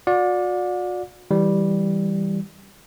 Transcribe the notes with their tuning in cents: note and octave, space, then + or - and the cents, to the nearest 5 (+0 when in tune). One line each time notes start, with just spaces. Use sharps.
F#4 -40 D5 +0 F#5 -45
E3 -5 G3 +0